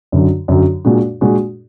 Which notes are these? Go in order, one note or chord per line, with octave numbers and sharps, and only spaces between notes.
F#2 D3 F#3
F#2 D3 F#3
A#2 G#3 D4 F#4
A#2 G#3 D4 F#4